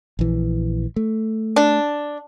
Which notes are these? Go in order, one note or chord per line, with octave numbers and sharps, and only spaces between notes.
A#1 E3
A3
D4